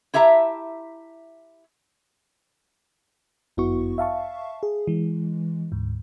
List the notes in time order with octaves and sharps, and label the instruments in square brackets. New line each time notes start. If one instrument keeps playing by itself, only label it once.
[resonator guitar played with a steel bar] E4 G4 E5 A5 A#5
[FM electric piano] G1 F#2 B3 E4 F#4 C#6
E5 F5 A5 C#6
G#4
E3 G#3
D2 G#2